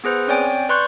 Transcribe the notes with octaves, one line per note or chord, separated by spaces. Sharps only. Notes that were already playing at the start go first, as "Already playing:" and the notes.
B3 G#4 B4 C5
C4 C#4 C#5 D5 G5 G#5
B4 D5 C6 C#6 F#6 G6